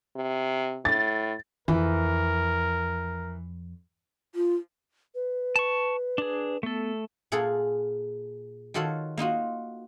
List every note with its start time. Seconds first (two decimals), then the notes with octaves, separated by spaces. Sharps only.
0.16 C3
0.85 A2 A6
1.68 F2 E3 A#4
4.35 F4
5.15 B4
5.56 A5 C#6
6.18 D4 G#4
6.63 A3 B3 A4
7.32 A#2 G#4 A4 F5 F#5
8.74 D#3 F4 F#4 A4 C#5 F5
9.18 A#3 D#4 F4 F#4